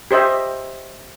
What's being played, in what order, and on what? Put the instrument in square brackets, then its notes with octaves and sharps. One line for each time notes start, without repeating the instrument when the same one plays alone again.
[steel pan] G4 C5 D#5 E5